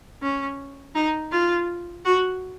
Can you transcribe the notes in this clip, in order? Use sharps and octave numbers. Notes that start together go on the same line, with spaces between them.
C#4
D#4
F4
F#4